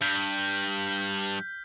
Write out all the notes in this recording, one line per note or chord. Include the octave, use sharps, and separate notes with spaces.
G2 F6 G6 B6